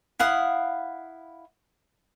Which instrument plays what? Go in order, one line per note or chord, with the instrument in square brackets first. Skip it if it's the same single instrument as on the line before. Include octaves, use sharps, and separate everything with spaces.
[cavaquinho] E4 F5 F#5 D#6